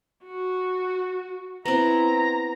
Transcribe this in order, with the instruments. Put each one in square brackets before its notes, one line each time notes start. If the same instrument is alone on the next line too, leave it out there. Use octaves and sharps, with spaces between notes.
[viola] F#4
[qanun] B3 C4 [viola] E4 [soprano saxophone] A#5